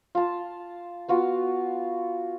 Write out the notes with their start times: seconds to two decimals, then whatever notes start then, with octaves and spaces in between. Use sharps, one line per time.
0.15 F4 A5
1.08 B3 F4 F#4